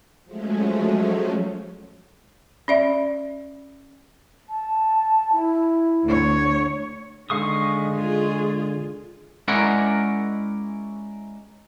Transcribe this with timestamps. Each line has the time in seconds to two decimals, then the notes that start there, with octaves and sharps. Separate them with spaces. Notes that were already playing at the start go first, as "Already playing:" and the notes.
0.25 F3 F#3 G#3 A3 C#4
2.68 C#4 D5 E5
4.49 A5
5.33 E4
6.04 D2 C#5
7.30 D3 D#3 G#3 F5 C#6 D#6
7.96 F4 G#4
9.48 G#3 C#4 E4 A#4 D5 F#5